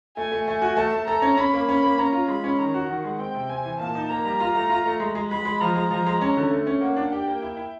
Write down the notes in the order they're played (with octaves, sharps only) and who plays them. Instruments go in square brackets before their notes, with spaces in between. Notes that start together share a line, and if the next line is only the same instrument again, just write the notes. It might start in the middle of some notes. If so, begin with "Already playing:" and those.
[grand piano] A3 [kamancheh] G#5
[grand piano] A3
[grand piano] A3 [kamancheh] G#5
[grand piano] F#4
[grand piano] A3 [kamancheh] A5
[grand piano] A3
[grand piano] A4 [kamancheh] A#5
[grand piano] C#4
[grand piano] C#4 [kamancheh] B5
[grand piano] A#3
[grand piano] C#4 [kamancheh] B5
[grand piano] A#3
[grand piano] C#4 [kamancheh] A#5
[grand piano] F4
[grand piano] G#3 [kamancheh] B5
[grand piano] C#4
[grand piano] D#3 [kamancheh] A#5
[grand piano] F#4
[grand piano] D#3 [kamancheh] F#5
[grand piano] G#3
[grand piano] C4 [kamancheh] G5
[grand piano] C3
[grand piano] C4 [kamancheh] G#5
[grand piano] E3
[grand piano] A#2 [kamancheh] A5
[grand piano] D#4
[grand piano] A#3 [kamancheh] A#5
[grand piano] G3
F4
A3
F4
A3
G#3
G#3
[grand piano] G#3 [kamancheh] B5
[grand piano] G#3
[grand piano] F3 [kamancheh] A#5
[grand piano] G#3
F3
G#3
C#4
D3
A3
C#4
[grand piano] A#3 [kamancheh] F#5
[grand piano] D4
[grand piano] G4 [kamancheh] G5
[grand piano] A#3
E4
E4